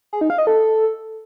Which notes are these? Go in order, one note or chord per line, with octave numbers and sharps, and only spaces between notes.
G#4
D#4
F5
D#5
A4